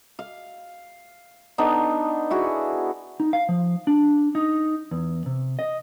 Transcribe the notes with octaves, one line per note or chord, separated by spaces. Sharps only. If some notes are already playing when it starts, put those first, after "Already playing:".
F5
B3 D4 D#4 A4
E4 F#4 G#4
D#4
F5
F3
D4
D#4
E2
C3
D#5